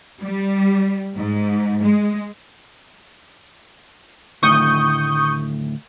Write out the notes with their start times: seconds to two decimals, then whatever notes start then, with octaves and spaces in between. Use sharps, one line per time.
0.21 G3
1.15 G#2
1.81 G#3
4.43 D2 A2 D#3 C#6 D#6 G6